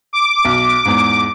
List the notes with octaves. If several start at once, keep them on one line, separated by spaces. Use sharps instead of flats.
D6
B1
E2 G#2